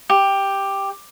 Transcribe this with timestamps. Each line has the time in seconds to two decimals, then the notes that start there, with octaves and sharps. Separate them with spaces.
0.10 G4